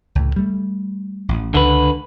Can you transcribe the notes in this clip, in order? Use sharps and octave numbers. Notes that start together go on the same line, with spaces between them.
C#2 A2
G3 A3
A1
C#2 D3 B4